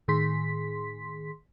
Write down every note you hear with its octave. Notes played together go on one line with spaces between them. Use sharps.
A2 D#3 G#4 C6 B6